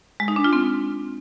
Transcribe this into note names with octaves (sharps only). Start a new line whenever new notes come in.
G#3
D#4
D4
F4
C4